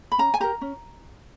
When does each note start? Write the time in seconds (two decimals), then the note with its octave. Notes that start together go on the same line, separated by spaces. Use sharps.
0.12 B5
0.18 C#4 A#5
0.34 G#5
0.40 G4 A#4 A#5
0.61 C#4